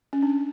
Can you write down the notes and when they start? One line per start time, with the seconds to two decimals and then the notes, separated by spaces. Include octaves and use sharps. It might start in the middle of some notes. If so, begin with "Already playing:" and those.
0.13 C#4
0.23 D4